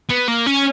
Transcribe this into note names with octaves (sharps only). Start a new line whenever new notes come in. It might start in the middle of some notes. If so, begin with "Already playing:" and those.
B3
A#3
C#4